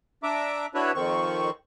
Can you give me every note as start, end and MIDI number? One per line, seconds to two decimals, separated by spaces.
0.23 0.66 62
0.23 0.66 76
0.23 0.66 82
0.23 0.66 86
0.75 0.92 62
0.75 0.92 64
0.75 0.92 66
0.75 0.92 71
0.75 0.92 73
0.75 0.92 76
0.95 1.50 41
0.95 1.50 51
0.95 1.50 60
0.95 1.50 85